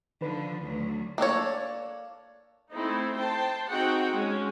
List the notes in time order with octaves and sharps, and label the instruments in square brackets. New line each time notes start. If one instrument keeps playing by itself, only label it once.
[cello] D3 F3 [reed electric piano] D#3 B4
[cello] D2 F#3
[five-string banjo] A#3 D4 A4 C#5
[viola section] A3 C4 D#4 E4
C5 G5 A5
C4 D#4 F#4 G#4 F#5 G5
G#3 C#4